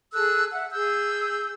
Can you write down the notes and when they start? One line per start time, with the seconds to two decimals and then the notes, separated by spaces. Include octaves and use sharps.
0.13 G#4 A4 E6 F#6
0.52 E5 F#5
0.72 G#4 E6 G6